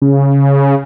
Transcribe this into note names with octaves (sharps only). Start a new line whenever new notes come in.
C#3